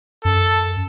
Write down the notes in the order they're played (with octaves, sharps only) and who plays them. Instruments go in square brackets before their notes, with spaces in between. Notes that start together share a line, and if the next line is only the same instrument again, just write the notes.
[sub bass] F#2 [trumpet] A4